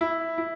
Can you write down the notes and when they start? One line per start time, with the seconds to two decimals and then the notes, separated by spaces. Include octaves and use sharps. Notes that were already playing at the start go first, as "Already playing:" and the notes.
0.01 E4
0.38 E4